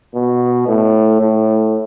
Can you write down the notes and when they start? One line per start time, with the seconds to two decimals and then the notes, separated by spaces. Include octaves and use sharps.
0.15 B2
0.68 A2
1.21 A2